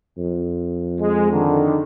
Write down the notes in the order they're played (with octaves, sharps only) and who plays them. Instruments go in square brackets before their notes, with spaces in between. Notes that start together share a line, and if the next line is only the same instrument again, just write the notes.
[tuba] F2
[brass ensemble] G#3
D3 D#3